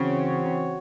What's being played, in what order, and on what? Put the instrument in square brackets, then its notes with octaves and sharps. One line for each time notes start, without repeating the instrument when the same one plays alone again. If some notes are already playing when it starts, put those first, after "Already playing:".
Already playing: [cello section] C#3 [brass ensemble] E3 C4 F#4 C#5